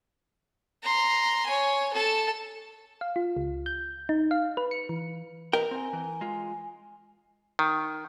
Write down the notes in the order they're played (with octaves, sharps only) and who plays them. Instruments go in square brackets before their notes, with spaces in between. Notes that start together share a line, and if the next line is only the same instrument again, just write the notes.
[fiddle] A#5 C6
C#5 G#5
A4 A5
[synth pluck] F5
F4
C#2
G6
D#4
F5
B4
C#7
E3
[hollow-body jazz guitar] A#4 [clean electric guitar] B4 D#5 G5
[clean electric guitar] C4 [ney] G#5
[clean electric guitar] E3
G#3 F4
[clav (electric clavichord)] D#3